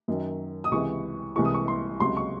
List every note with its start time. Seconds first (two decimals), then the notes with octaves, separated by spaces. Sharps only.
0.08 F#2 D#3 F#3
0.64 D#6
0.71 C#2 C3 E3 G#3 C#6
1.36 C2 C3 E3 G#3 C#6
1.45 D#6
1.54 C#6
1.68 C6
1.99 C#2 C3 F#3 C6
2.17 C#6